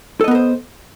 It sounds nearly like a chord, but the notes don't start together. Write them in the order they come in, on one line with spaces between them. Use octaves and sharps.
A4 D#5 B3 A#4 C5